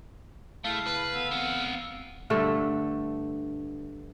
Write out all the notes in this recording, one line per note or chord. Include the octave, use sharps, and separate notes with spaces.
C#3 A3 E4 F5 A5
B4
D3 B3 E6
C4 F#5
G2 D3 A3 D4